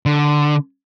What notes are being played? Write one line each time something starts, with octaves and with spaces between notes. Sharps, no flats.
D3